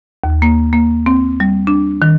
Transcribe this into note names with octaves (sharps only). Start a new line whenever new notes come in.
D#2
A#3
A#3
C4
G3
D4
D#3